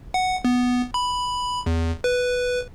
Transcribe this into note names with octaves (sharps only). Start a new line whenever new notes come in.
F#5
B3
B5
E2
B4